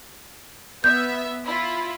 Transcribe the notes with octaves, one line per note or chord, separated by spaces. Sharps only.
B3 E5 G6
E4 F4